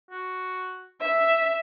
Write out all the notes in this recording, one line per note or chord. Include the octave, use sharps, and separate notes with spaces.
F#4
E5 E6